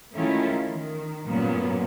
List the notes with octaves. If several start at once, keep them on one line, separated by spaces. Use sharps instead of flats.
D#3 G#3 A3 C#4 E4 F4
D#3
G2 A#2 F#3 B3 C#4